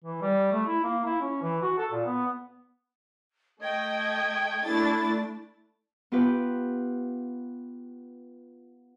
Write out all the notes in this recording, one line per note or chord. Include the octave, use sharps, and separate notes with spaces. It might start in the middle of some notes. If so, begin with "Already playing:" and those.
E3
G3
A3
E4
A#3
E4
C#4
E3
F#4
A4
A#2
B3
A3 D#5 G5 G#6
A3 D4 E4 A6
B3 F4 G4 B4